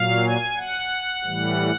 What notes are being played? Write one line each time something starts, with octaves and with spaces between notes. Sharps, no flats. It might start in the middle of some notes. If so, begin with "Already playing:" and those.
Already playing: A#2 F#3 F5
G#5
F#5
A2 E3 G3